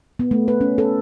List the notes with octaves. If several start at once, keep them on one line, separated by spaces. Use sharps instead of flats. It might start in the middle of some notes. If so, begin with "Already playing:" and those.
B3
A3
B4
C#4
A4